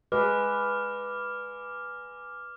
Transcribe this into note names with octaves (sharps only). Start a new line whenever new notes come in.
G#3 B4 D6 F6